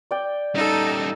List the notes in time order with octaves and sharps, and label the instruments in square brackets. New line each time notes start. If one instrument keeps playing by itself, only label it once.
[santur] D5 G5
[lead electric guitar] G3 C#4 [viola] D#4 A4